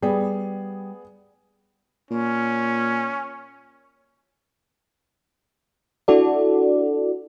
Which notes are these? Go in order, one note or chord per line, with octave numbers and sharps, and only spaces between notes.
G3 B3 G#4
A#2 C#4
D4 E4 F#4 A4 D5